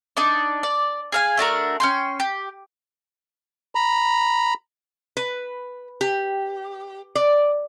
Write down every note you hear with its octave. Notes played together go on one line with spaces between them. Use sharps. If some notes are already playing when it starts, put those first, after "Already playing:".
D4 D#4 D5
D5
G#4 F5 G#5
A3 D4 F#4 A#4
C#4 G5 C6
G4
A#5 B5
B4
G4
D5